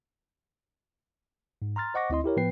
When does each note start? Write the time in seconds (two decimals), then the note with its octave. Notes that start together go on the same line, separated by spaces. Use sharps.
1.62 G#2
1.76 A#5 C6 F6 A6
1.94 C5 D#5 F#5 C#6 D6 A#6
2.10 D2 C4 E4 D#5 C6
2.24 E4 G4 A#4 C#5
2.37 A2 F3 B3 B4 G5 C7